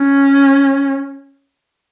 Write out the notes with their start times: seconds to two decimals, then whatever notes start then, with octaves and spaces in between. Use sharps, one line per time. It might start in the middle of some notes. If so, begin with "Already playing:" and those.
Already playing: C#4